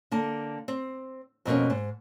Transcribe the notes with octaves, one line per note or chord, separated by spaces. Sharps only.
D3 A#3 A5
C4
F2 B2 A#3 C#4
G#2